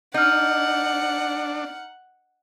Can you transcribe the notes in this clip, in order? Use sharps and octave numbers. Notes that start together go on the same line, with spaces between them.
D4 D#4 F#5 F6 G6